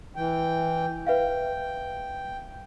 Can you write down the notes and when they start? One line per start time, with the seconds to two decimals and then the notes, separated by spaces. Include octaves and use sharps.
0.16 E3 G5
1.07 B4 E5 F5 G5